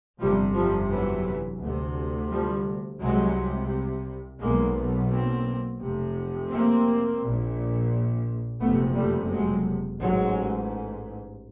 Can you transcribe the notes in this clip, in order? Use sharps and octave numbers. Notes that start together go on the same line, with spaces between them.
G1 F2 C3 F3 G3
F3 G3
E3 F#3
D2 C3
F3 G3
C2 C3 F#3 G#3
B1 B2 G#3 A#3
A#3 C4
F1 F2 C3
A#3 C4
A#1 A#2
F#1 F2 C3 A3 B3
G3 A3
F#3 G#3
A1 G#2 F#3 G#3